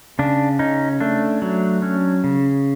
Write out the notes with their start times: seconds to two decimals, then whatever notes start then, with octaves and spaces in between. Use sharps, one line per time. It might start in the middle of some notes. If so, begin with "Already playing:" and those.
0.19 C#3 D4
0.59 C#4 D#4
1.00 A3 D4
1.42 F#3
1.82 C#4
2.24 C#3